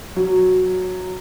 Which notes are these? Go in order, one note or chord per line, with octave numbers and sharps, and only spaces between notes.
F#3